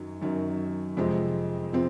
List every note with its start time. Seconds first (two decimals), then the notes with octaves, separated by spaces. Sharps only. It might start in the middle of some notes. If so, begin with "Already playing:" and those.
Already playing: F#2 D#3 F#3
0.22 F#2 D#3 F#3
0.97 F2 C3 F3 G#3 C4
1.73 C3 F3 C4